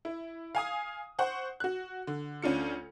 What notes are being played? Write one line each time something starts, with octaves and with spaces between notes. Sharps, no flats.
E4
F5 G#5 D#6
C5 F#5 C#6
F#4 F#6
D3
D2 C#4 D4 F4 C#7